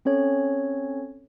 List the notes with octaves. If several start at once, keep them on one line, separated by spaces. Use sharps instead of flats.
C4 C#4 A4 C#5